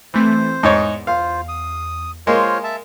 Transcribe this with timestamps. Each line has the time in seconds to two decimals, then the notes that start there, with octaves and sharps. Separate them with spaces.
0.14 E3 A3 C4 C5
0.63 E2 G#2 D#4 C#5
1.07 F4 C5 F5
1.48 D#6
2.27 G#3 A#3 F4 C5 C#5
2.64 E5 A5